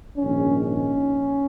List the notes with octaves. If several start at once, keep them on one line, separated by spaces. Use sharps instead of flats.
A#1 G#2 D#3 C#4
C#4